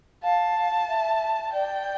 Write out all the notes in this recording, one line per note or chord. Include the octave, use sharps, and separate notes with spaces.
F5 A5
E5
D5 G5